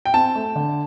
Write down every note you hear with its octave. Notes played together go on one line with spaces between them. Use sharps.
G5
C4 A5
A3
D3